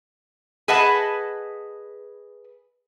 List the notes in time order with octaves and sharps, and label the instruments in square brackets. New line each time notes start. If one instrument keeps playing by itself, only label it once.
[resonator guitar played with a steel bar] G#4 B4 D#5 F#5 A5